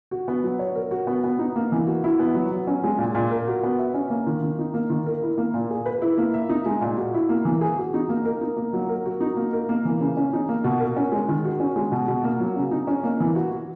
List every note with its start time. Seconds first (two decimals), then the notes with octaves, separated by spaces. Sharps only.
0.11 F#4
0.28 B3
0.43 F#3
0.59 C#5
0.75 A#4
0.91 F#4
1.07 B3
1.24 B3
1.39 D#4
1.56 A#3
1.72 E3
1.87 F#4
2.04 E4
2.19 B3
2.35 F#3
2.51 F#3
2.67 C#4
2.84 G#3
2.99 A#2
3.15 A#2
3.31 A#4
3.47 F#4
3.63 B3
3.78 E5
3.94 C#4
4.10 A#3
4.27 D#3
4.42 D#3
4.59 D#4
4.74 A#3
4.90 D#3
5.06 A#4
5.23 E4
5.38 A#3
5.54 A#2
5.71 G#4
5.86 B4
6.02 E4
6.18 A#3
6.34 E5
6.49 D#4
6.66 G#3
6.81 A#2
6.97 F#4
7.14 E4
7.29 A#3
7.45 E3
7.61 G#4
7.77 F#4
7.94 D#4
8.09 A#3
8.25 A#4
8.41 D#4
8.57 A#3
8.73 F#3
8.89 A#4
9.05 F#4
9.21 D#4
9.37 A#3
9.53 A#4
9.69 A#3
9.85 E3
10.00 C#3
10.17 C#4
10.33 D#4
10.49 A#3
10.64 B2
10.80 A#4
10.96 C#4
11.12 G#3
11.29 D#3
11.45 F#4
11.60 C#4
11.76 G#3
11.92 B2
12.08 B2
12.24 A#3
12.40 F#3
12.56 C#3
12.71 D#4
12.87 C#4
13.04 A#3
13.20 E3
13.35 F#4
13.52 F#4